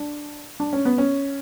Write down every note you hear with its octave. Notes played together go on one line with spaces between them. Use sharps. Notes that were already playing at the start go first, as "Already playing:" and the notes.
Already playing: D4
D4
C#4
B3
C#4